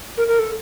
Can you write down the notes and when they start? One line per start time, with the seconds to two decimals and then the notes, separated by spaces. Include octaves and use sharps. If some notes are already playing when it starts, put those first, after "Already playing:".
0.18 A#4
0.28 A#4
0.39 A4